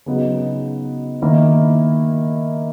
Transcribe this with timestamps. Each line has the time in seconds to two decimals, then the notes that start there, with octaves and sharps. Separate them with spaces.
0.06 C#3 F#3 B3 D#4
1.22 D#3 A#3 E4 A#4